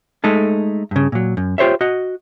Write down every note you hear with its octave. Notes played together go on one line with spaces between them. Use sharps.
G#3 A3 D#4 A4
G2 C#3
A#2 F#3
F#2
F4 G4 C5 C#5 E5
F#4 D#5